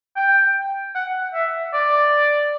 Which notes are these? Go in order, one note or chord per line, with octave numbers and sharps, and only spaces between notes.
G5
F#5
E5
D5